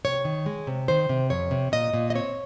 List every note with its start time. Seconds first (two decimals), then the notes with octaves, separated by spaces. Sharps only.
0.05 C3 C#5
0.25 D#3
0.46 G#3
0.67 C3
0.88 D#3 C5
1.09 C3
1.30 F2 C#5
1.51 C3
1.72 A#2 D#5
1.94 A#2
2.10 D#5
2.15 C4 C#5